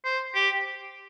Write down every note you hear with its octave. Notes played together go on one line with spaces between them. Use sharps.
C5
G4